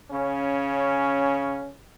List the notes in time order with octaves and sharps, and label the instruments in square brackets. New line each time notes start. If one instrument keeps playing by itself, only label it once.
[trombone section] C#3 C#4